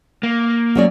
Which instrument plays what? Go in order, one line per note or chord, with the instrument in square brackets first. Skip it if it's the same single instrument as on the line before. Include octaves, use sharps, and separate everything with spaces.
[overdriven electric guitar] A#3
[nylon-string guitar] F#3 C#4 D5